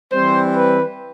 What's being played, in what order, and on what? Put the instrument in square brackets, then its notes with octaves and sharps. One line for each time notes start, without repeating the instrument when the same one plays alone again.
[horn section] E3 G3 C4 C5
B4